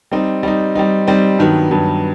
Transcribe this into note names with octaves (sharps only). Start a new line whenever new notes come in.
G3 C4 D#4
G3 C4 D#4
G3 C4 D#4
G3 C4 D#4
G2 D#3 F#3 B3
G2 D#3 F#3 B3